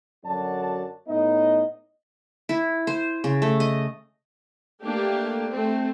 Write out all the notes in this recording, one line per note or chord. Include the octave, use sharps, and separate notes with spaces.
F#2 D3 F#4 D5 A5
A2 B3 D#4 D#5
E4
C5
C#3
A3
D#5
A3 A#3 D4 G4
A3 C4